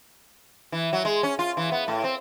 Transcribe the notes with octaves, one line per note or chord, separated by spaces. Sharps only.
E3
F#3
G#3
C#4
F4
E3
B3
A2
C4